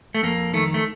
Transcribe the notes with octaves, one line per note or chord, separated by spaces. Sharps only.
A3
F2 A#3
D#3 A3
A3